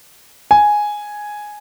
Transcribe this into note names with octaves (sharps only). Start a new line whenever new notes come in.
G#5